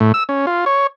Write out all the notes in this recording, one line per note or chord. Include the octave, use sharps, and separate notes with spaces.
A2
E6
C#4
F4
C#5